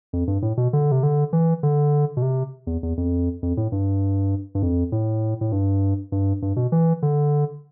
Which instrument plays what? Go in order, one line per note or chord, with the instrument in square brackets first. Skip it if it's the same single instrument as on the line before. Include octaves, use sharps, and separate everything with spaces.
[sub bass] F2
G2
A2
B2
D3
C3
D3
E3
D3
B2
C3
E2
E2
F2
F2
A2
G2
G2
F2
A2
A2
G2
G2
G2
B2
E3
D3